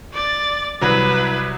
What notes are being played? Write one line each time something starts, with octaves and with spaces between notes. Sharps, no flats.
D5 A6
C2 F#3 E4 B4